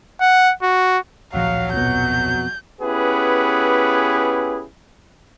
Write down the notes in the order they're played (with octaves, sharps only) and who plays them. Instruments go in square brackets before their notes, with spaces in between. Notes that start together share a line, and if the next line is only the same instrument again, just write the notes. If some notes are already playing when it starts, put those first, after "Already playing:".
[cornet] F#5
F#4
[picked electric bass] D1 A#1 F3 [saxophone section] F#3 [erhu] F5
[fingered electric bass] F2 B2 [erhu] G6
[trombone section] B3 C#4 E4 G4 G#4 B4